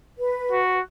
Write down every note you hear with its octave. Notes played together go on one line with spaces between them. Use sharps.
B4
F#4